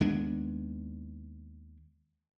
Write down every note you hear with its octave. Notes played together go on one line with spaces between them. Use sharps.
D#2 G#3 B3 D4